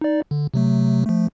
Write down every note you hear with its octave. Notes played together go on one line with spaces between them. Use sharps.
D#4 D5
D3
C3 F#3 A3
F3 A3